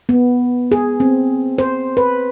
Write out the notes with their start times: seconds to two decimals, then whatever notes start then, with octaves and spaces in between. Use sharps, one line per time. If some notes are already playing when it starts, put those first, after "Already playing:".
0.09 B3
0.72 G#4
1.00 C4
1.58 C5
1.97 B4